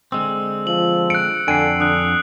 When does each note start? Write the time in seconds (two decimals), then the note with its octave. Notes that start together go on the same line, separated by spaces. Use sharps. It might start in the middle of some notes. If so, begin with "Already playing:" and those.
0.12 D3 G#3 C4 E6
0.67 F3 F#7
1.10 F#6 C#7 D7
1.48 F2 D3 G5 G#5 C7 D7
1.80 D3 D#6 F#6